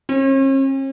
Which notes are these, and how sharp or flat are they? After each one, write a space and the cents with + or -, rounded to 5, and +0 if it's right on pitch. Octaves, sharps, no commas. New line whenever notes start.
C#4 -45